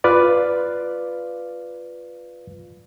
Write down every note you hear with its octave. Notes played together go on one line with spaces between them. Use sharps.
F4 B4 D5 F5